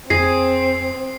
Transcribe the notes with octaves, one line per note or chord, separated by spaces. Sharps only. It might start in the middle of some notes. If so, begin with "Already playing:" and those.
F2 C4 G#4 C7